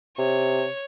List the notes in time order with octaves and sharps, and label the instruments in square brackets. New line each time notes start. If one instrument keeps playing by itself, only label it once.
[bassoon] C3 [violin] C#5